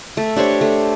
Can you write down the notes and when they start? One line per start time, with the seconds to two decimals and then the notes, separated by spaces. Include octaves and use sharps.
0.17 A3
0.36 D4 G4 C5 C#5
0.61 A3